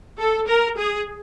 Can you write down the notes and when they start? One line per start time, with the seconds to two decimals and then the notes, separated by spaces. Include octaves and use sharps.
0.19 A4
0.47 A#4
0.77 G#4